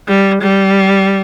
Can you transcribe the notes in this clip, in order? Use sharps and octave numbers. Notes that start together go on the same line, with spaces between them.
G3
G3